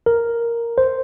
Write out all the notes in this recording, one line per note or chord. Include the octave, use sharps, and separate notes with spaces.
A#4
C5